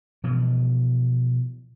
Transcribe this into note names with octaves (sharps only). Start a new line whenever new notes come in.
B2 E3 F3